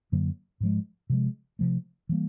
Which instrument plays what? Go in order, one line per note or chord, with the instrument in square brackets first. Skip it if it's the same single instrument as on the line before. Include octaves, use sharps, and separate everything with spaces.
[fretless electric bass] F#2 D3 F#3 A#3
G#2 F3 G#3
C3 F3 G#3
C3 F3 A3
E3 G3 A#3